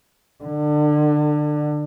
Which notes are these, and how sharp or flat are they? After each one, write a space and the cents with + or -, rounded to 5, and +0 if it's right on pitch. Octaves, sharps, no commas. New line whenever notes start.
D3 +25